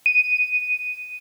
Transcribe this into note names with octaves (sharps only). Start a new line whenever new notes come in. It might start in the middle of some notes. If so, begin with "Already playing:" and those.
D#7